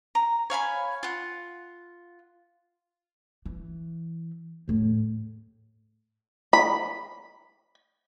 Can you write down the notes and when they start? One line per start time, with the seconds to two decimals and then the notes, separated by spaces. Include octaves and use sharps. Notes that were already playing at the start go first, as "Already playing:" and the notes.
0.15 A#5
0.50 C#5 F5 G#5 B5
1.03 F4 F#5
3.45 E3
4.68 E2 A2
6.53 B5